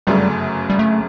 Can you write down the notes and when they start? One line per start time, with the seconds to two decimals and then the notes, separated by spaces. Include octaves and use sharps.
0.07 G1 F#2 C#3 F#3 G3 A3
0.70 G3
0.79 A3